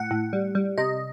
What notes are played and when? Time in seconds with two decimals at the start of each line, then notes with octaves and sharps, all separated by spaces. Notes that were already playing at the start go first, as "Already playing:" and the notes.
Already playing: A2 F#5
0.11 A2
0.33 G3
0.55 G3
0.78 C3 D#5